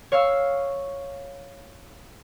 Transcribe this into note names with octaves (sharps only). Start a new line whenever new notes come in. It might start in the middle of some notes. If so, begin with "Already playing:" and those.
C#5 F5 C#6 E6